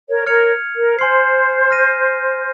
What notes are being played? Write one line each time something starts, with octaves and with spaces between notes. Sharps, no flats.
A#4 C#5
A#4 C#5 F6 G#6 C#7 F7
A#4
C5 G#5 C6 F6 C7
F6 A#6 D#7